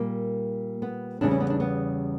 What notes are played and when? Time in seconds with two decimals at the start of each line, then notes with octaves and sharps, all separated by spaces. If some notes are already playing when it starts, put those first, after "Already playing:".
Already playing: A#2 G3 A#3
0.82 B3
1.21 E2 C#3 G3 D4
1.31 C#4
1.40 B3
1.50 D4
1.60 B3